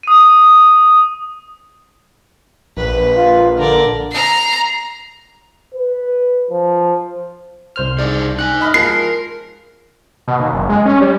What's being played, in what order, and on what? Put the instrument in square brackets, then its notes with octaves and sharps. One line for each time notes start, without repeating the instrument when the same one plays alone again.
[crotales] D#6 D#7
[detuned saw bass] A#1 [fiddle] B4
[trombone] F4
[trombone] D3 [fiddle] A#4 D5
[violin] A#5 C7
[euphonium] B4
F3
[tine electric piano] C2 C5 F6
[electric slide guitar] D4 D#4 G#4 [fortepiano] D5
[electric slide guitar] D#4 G5 G#5 [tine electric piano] F#6
[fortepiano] D#5 B5 F6
[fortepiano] F3 G#3 [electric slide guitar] A#4 [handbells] C7
[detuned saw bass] B2
D#2
F#1
G#3
C#4
G3